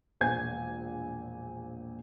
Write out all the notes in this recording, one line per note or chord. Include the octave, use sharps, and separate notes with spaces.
E1 A#1 A#2 C5 G#5 G#6